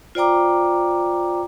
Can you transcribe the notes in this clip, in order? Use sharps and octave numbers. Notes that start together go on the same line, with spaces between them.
F4 C5 D5 G5 A#5 D6